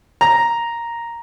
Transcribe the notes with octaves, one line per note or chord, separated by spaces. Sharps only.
A#5